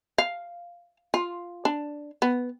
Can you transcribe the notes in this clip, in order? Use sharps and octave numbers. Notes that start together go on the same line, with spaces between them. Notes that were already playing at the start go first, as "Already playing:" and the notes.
F5
F4
D4
B3